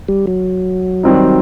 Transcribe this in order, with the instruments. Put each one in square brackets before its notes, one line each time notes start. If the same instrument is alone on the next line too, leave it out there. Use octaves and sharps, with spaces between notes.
[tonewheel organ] G3
F#3
[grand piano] D#3 G3 C4 D#4